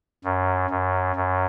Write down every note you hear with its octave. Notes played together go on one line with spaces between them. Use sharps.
F#2
F#2
F#2